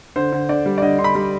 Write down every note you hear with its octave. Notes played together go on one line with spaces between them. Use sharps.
D3 C5
D3
D3 D5
G3
D5
D3 D#5
D3 C6
B5
G3 B5